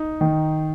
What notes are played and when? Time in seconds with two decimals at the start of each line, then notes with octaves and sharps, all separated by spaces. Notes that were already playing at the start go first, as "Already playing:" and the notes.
Already playing: D#4
0.21 D#3